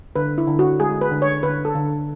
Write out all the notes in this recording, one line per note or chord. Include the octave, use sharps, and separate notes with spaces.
D3 B4
E4
D3
F#4
G#3 G#4
B4
D3
C#5
D3 B4
A4
D3